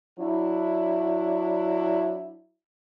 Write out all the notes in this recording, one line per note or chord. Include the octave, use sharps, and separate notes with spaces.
F#3 D4 E4